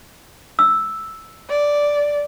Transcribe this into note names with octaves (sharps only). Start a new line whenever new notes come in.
E6
D5